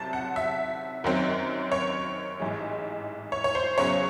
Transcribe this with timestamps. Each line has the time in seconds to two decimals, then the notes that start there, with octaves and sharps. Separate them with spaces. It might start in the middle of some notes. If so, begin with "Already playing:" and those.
Already playing: C2 C3 F#3 C4 A5
0.13 F#5
0.36 E5
1.04 F#2 D#3 F#3 C4
1.72 C#5
2.40 A1 G#2 E3 G#3
3.32 C#5
3.44 C#5
3.55 C5
3.77 E2 C#3 F#3 C#4 C#5